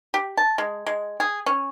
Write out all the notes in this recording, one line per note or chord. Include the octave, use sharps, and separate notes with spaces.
G4
A5
G#3
G#3
G#4
C#4